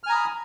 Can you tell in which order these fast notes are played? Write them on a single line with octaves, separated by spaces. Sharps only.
F6 G#5 A#5 D#6 B5